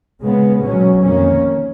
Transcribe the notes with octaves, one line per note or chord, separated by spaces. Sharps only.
C#3 G#3 B3
B2 F#3 C#4
F2 D#3 A#3 C#4